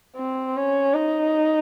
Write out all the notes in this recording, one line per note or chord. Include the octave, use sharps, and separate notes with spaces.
C4
C#4
D#4